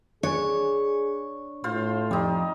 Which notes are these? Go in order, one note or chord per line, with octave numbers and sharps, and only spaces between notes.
D4 G#4 C#5 D5 G#5
A2 F4 C5 F5
F2 G3 D#4